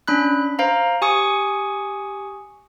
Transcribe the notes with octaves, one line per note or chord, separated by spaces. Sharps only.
C#4 D4 B5 F#6
C5 F5 A#5
G4 G#5 C#6 D#6 C#7